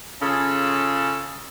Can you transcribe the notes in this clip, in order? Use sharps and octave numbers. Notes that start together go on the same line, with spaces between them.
C#3 C#4 F4 G#4 A4